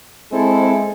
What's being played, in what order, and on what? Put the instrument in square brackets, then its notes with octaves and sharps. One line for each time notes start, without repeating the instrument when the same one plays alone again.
[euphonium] G#3 [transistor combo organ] C4 [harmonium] E4 A4